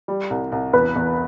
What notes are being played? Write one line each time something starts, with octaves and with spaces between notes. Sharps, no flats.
G3
C2
C2
E2 B4
E2